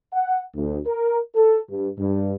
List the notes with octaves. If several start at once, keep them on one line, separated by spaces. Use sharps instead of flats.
F#5
D2
A#4
A4
G2
G2